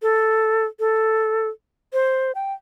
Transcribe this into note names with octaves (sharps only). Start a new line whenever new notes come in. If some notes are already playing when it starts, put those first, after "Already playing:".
A4
A4
C5
G5